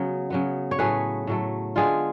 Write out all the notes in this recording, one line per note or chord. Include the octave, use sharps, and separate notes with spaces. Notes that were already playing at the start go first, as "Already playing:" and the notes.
Already playing: C#3 F#3 B3
C#3 F#3 B3
C#5
A2 F#3 A3 G#4 B4
A2 F#3 A3
D3 G#3 B3 F4 G#4